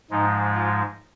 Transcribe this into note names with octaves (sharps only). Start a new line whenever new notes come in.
G#2 F3 G#3 D#4
F4